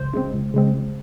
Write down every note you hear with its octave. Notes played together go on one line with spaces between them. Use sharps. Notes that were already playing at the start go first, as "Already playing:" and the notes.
Already playing: C#2 C5
C#3 G#3 C4
C#2
C#3 G#3 C4
C#2